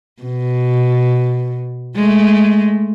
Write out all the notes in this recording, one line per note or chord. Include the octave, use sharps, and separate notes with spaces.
B2
G#3 A3